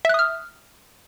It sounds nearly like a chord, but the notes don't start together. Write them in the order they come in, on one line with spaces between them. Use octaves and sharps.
E5 F#6 D#6 F6